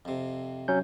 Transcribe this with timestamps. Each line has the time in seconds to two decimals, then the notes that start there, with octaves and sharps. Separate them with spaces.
0.05 F2 C3
0.68 F#3 C#4 G6